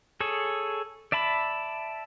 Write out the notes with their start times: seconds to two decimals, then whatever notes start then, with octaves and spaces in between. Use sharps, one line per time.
0.20 G#4 A4 C#5
1.12 D5 E5 A5 B5